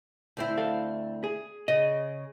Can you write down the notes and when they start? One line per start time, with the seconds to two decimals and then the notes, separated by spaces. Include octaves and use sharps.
0.37 D2 C4 E4
0.58 A4 F5
1.24 G#4
1.68 C#3 D#5